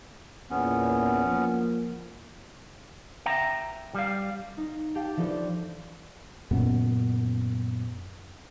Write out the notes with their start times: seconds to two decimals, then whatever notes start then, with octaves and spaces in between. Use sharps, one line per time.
0.50 E2 A#2 B3 C#4
1.25 F3 A#3
3.26 E5 G5 A#5
3.95 G3 F5
4.57 D#4
4.95 G4 F5 G5 A5
5.17 E3 F3 D4 G4 A4 C5
6.51 F#2 A#2 C#3 B3